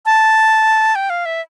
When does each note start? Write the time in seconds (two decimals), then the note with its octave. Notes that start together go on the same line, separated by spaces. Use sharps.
0.06 A5
0.95 G5
1.10 F5
1.26 E5